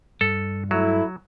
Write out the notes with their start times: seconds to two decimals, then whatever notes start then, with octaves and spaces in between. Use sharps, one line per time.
0.21 G2 A4
0.71 F#3 A3 E4